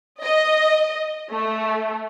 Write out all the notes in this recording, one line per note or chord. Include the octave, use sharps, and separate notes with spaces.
D#5
A3